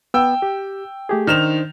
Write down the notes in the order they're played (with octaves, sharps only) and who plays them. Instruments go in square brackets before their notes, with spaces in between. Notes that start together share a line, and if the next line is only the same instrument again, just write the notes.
[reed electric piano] B3 [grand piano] G5 E6
[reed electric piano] G4
A3 G4 G#4
[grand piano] D#3 E7 F7 [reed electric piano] D4 D#4 C5